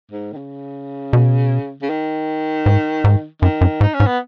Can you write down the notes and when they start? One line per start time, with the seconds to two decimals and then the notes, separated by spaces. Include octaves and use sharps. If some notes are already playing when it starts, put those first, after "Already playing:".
0.11 G#2
0.32 D#3
0.37 C#3
1.13 B2
1.82 C#3
1.90 D#3
2.66 G#2
3.04 G#2
3.42 F#2 D#3
3.61 F#2
3.81 G#2 D#4
3.94 C#4
4.00 G#2
4.06 B3